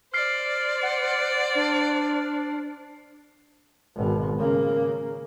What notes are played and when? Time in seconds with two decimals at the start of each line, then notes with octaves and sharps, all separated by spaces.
0.14 C5 D5 F6 C7
0.83 F#5
1.55 D4
3.96 G#1 B2
4.38 C#3 A#3